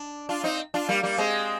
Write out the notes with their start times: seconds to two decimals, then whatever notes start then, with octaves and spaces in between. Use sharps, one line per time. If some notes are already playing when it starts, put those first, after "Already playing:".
Already playing: D4
0.29 D4 F4
0.44 C4 D#4
0.74 D4 F4
0.89 G3 A#3
1.03 G3 A#3
1.18 G#3 C4